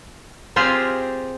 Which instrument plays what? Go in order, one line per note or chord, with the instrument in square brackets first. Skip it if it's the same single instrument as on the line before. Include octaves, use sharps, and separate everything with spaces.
[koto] C4 F4 G4 G#4 F5 G#5